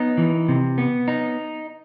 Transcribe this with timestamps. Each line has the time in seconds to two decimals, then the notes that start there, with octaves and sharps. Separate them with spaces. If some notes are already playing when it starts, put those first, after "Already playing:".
Already playing: B3 D#4
0.18 E3
0.48 C3
0.78 B3
1.08 D#4